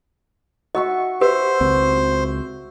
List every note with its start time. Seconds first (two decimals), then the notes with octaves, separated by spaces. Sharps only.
0.75 F#4 D#5 E5 C#6
1.21 G4 B4 C5 E5
1.61 C#2 C4